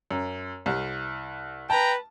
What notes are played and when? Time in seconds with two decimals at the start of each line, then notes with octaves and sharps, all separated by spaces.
0.11 F#2
0.66 C2
1.70 B4 G5 A5 A#5